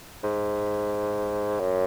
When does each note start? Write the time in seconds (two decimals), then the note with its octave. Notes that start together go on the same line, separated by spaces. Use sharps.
0.23 G#2
1.60 F#2